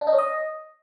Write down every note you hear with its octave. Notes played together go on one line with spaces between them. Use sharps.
D4
D#4
C#4
D#5